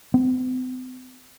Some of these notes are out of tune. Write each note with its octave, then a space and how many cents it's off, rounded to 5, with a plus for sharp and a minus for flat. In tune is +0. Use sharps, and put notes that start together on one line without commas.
C4 -45